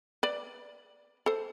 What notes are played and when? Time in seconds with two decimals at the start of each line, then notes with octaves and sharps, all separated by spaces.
0.23 B4 D5
1.26 A4 C5